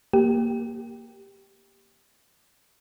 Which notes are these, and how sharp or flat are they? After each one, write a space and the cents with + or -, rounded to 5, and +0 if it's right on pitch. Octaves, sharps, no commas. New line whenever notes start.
A#3 +0 G4 +0